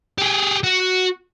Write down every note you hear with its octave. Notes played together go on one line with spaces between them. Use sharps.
G4 G#4
F#4